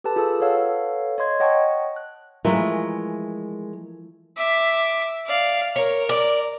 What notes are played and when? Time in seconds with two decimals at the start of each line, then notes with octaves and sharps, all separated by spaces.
0.04 G4 A4 B4 A5
0.16 F4 G#4 A4 A5 E6
0.40 A4 B4 C#5 F5 F#5
1.18 C#5 D#5 C6 G#6
1.40 C#5 D#5 F#5 G5 A5 C#6
1.96 F#6
2.45 E3 F3 G#3 A3 A#4
4.37 E5 D6
5.26 D5 F5
5.76 A#4 C#5
6.09 D5